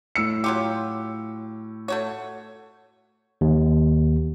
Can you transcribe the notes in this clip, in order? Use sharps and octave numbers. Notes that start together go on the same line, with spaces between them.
A2 E6 C#7
F#3 F4 G4
A3 F#4 C#5
D#2